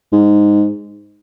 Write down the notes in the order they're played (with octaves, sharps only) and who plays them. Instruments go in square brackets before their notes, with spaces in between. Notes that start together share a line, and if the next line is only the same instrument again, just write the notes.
[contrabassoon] G#2